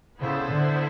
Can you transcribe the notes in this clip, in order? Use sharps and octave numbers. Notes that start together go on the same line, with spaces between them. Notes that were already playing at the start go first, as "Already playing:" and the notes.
C#3 B3 E4 A4 C5
D3